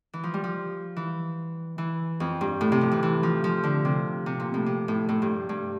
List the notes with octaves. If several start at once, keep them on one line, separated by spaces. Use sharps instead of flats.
E3
F3
G3
F3
E3
E3
F2
G2
A2
C3
F3
E3
E3
F3
F3
D3
C3
C3
A#2
A2
C3
A2
A2
G2
G2